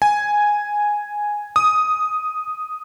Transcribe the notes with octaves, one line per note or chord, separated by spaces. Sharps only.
G#5
D#6